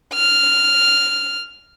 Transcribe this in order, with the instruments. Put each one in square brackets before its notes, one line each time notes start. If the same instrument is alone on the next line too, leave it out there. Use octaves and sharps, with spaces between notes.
[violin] F6